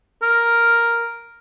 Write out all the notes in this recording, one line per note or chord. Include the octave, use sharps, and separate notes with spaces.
A#4